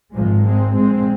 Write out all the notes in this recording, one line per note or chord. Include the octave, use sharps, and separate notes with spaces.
G#1 G#2 F3 G#3
G#3 C4
A#1 A#2 G#3 C4